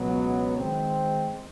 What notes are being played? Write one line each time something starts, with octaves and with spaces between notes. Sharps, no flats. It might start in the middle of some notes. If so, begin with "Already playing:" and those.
Already playing: C#2 B2 F#3 B3
D#3 G#3 C4